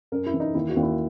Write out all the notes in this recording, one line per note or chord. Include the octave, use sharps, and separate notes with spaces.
F#2 A#4
E4
E3
D#4
D#2 E4
F#4
D#2
E4